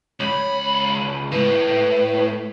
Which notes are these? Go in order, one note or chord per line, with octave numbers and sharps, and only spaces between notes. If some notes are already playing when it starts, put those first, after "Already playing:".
C#2 C#5 B5
A2 A3 B4